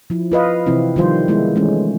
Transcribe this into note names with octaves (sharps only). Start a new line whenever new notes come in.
F3 E4
F4 B4 D#5 F5
C3 E3 C4 E4
D#3 F3 G3 F4 C5
G#3 B3 E4
E3 G#3 A3 C#4